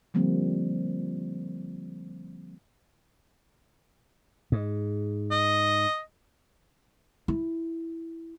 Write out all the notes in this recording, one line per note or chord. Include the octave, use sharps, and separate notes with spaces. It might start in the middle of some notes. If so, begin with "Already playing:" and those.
D3 F3 G3 A#3 C4
G#2
D#5
E4